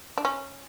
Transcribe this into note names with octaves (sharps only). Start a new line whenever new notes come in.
D4
C#4